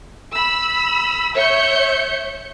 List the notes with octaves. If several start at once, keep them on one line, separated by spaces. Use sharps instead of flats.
B5 E6
C#5 E5 G6 C#7